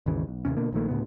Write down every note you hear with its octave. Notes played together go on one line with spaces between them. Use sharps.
G#1 D#2 C#3 E3
B1
D#2 A2 C3 C#4
B2 D3 A#3
A#1 D#3 A3 A#3
D2 A2 C#3 B3